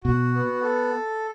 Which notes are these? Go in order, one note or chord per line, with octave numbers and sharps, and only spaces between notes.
B2 F#4
B3
A4